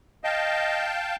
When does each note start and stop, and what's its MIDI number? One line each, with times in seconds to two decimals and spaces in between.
0.24 0.94 75
0.24 1.16 77
0.24 1.16 79
0.24 1.16 81